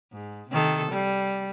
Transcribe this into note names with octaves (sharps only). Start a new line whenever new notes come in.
G#2
C3 D#3 A4
G3